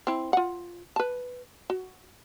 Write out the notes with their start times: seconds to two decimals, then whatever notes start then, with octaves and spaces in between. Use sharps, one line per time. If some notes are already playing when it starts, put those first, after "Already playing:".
0.07 C4 E4
0.33 F4 F#5
0.96 B4 A5
1.70 F#4